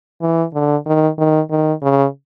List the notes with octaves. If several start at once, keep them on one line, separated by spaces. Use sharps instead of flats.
E3
D3
D#3
D#3
D#3
C#3